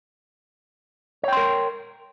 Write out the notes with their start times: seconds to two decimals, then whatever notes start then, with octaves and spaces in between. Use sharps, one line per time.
1.23 C#5
1.28 G5
1.33 C6
1.37 A#4